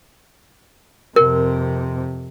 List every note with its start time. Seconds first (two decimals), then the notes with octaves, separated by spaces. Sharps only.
1.16 F2 C3 A#4